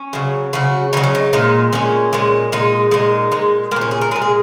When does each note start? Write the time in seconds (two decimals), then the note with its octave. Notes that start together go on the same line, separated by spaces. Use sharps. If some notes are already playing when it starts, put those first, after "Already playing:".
Already playing: C#4
0.13 C#3 F#3
0.53 C#3 F#3 F#4
0.93 C#3 F#3 D#4
1.04 C#4
1.15 D#4
1.33 A#2 G#3 D#4
1.73 A#2 G#3 C#4
2.13 A#2 G#3
2.52 A#2 G#3 D#4
2.91 A#2 G#3 D#4
3.32 A#2 G#3
3.71 G#3 A#3
3.76 A#2
3.81 C#4
3.91 G#4
4.01 A#4
4.11 G#3 G#4
4.16 A#2
4.22 G#4